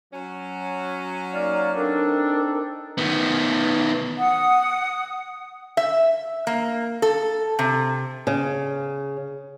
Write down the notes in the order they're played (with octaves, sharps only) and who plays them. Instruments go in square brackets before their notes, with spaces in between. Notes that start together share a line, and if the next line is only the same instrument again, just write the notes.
[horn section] F#3 C#4
[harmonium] A#3 D#4 F#4 [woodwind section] D5 F5
[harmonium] C4 D#4 A4 [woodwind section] D4 [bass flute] A#4
[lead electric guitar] D#3 B3
[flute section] F#5 D#6
[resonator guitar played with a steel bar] E5
A#3
A4
C3
[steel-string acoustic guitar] C#3